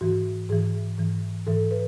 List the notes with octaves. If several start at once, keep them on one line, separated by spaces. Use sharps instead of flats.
G#2 E3 F#4
G#2 E3 G#4
G#2 E3
G#2 E3 A4
B4